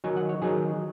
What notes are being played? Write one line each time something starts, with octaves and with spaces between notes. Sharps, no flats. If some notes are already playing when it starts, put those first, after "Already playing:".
D#3 F#3 D#4 G#5
F#5
C#5
D#3 F#3 D#4 G#4